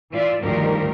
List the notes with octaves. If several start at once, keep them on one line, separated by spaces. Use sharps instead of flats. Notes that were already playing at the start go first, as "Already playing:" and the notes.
E3 F4 D5 E5
D2 G2 D#3 F3 G4 A#4